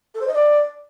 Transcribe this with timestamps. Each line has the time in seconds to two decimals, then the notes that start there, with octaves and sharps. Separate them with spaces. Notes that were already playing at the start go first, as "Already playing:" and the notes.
0.15 A4
0.21 C5
0.28 D#5
0.34 D5